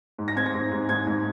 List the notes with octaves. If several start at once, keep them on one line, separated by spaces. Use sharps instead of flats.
G#2
A#6
C4 G#6
A#6
G#2
G#2
G#2 G#6
G#2